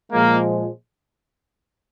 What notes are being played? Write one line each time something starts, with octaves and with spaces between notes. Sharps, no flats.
A#2 F3 G#3 A#3